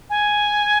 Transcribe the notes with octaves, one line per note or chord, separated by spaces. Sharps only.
G#5